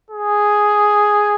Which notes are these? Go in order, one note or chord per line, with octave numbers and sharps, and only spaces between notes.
G#4